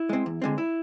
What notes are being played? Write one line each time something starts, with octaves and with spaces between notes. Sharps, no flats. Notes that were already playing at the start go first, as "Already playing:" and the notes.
Already playing: E4
G#3 C4
E2
D3 G#3 C4
E4